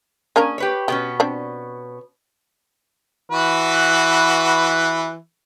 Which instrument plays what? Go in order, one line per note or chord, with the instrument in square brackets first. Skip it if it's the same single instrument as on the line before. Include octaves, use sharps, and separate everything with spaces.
[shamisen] A#3 D4 A#4 [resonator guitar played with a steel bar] C#4 G#4
[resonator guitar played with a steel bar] G4 B4 C#5
[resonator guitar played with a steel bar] B2 B3 C#4 [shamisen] G4
[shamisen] C4 D4 D5
[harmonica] E3 F#4 B4